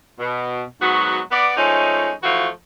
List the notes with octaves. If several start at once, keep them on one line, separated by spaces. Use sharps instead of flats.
B2
G#2 F#3 B3 F#4
B3 D5
F3 G#3 A3 C#4 D#4
E3 F3 A3 F4 F#4